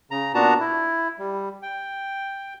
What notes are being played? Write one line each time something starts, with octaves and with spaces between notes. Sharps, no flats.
C#3 A#5
A#2 B3 D4 F#4 A5 A#5
E4
G3
G5